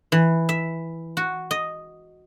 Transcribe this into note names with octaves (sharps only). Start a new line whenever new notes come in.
E3
E5
F#4
D#5